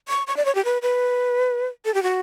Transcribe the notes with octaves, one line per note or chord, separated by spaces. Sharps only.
C#6
C#6
D5
C#5
G4
B4
B4
A4
G4
F#4